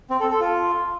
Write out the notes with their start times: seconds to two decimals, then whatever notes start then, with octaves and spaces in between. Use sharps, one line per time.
0.10 C4
0.20 A4
0.30 A4
0.40 F4